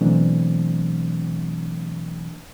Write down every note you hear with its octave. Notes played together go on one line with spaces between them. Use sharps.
B2 E3 F#3 A3 C4 D4